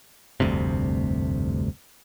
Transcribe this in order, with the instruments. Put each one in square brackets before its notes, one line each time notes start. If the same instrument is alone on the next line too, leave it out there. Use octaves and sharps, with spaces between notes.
[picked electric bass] F1 D2 G2 C3